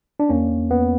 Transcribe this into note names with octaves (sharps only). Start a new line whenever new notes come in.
D4
E2 A#3 C#4
E2
E2 B3